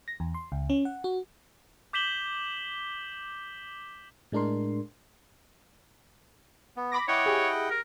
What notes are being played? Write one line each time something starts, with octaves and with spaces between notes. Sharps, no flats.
A#6
E2
C6
C#2
C#4
F#5
F#4
D6 G6 B6 E7 F#7 G7
A2 G#3 D4 A#4 C6
B3
B5 D6 A#6
E4 C#5 D#5 F#5 G5 C#6 D6
G4 G#4
A#4